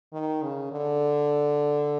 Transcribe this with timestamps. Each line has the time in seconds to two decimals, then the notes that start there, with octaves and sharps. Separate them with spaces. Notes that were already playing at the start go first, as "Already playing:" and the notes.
0.13 D#3
0.42 C#3
0.72 D3